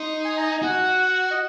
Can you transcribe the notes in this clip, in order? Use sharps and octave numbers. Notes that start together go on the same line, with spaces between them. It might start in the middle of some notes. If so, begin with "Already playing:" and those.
Already playing: D#4 C6
G#5
A#5
G#5
F#4 F#5
D#5